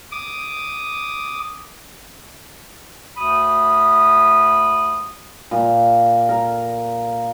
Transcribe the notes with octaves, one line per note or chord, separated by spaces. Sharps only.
D6 D#6
D2 B5 D#6
A#2
A#4